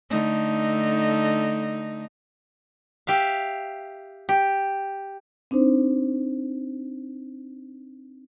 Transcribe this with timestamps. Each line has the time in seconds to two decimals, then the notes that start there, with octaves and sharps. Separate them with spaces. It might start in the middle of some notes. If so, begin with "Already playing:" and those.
0.10 D3 A3 D#4
3.07 G4 E5 F5
4.29 G4
5.51 C4 D4 D#4 C5